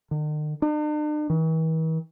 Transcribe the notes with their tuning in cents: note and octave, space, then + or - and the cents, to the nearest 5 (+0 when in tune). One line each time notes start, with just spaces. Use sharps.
D#3 -45
D4 +45
E3 -45